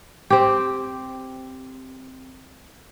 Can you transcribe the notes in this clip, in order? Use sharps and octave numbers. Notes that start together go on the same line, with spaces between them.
C4 G4